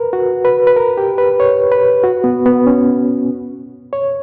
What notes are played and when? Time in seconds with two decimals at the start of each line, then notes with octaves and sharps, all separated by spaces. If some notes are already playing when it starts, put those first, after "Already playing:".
Already playing: A#4 B4
0.13 F#4
0.45 B4
0.67 B4
0.77 A#4
0.98 G4
1.18 B4
1.40 C#5
1.72 B4
2.04 F#4
2.24 B3
2.46 B3
2.67 C#4
3.93 C#5